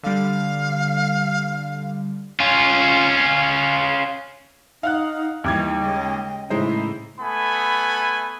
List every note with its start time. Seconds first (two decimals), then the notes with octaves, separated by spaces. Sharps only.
0.03 D3 G3 F5
2.40 C#4 F4
4.83 D#4 F5 F#5 F#6
5.44 D#2 E3 G3 D#4 G5 D6 G#6
5.79 C#3 G#3 D#5
6.50 A2 C#3 E3 G#3 D#4 E4 C5
7.21 A3 B3 G#5 B5